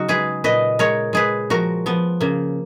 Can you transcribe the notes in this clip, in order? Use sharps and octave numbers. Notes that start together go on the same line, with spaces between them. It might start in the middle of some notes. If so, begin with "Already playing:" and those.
Already playing: C#3 F#3 C#4 D#4 F#4
G#3 G#4 B4
A#2 B4 D#5
G#3 A#4 C#5
G#3 G#4 B4
F3 F#4 A#4
F3 B3
C#3 A#3